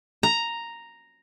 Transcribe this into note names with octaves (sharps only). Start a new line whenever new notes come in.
A#5